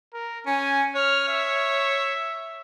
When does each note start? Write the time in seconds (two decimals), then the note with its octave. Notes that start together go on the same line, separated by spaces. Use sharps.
0.13 A#4
0.46 C#4 G#5
0.95 C#5 F6
1.29 E5